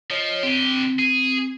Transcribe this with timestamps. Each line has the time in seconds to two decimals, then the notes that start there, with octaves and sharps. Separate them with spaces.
0.11 F3 C#5 D#5
0.43 D3 C4 G4
0.99 G#4